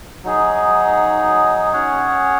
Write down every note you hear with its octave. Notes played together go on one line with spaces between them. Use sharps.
F#3 D#4 G#4
C#4 G#4 C#5 F#5